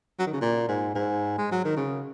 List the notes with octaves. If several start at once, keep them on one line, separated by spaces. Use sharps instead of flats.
F#3
D#3
C#3
A#2
G#2
G#2
G#3
F#3
D#3
C#3